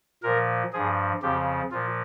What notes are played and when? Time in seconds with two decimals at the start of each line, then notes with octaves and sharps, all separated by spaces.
0.23 A#2 F3 A#4
0.73 G2 F3 G#4
1.22 F2 C#3 F3 G4
1.71 A#2 F3 F4